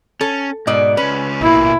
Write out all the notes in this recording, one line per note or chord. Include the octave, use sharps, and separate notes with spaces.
C#4 A4
G#2 B2 D5 D#5
C#2 C#4 B4
B2 A#3 E4